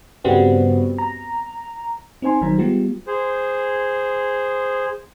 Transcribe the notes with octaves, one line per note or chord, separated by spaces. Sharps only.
G2 C#3 G3 B3 C4 F#4
A#5
C4 D#4 C5 G#5 C6
A1 D#3 F#3 D#4 C5 A#5
G3 G#3 B3 F4 G4
G#4 C5